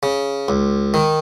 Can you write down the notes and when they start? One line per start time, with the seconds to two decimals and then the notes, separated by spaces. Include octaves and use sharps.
0.03 C#3
0.48 C#2
0.94 D#3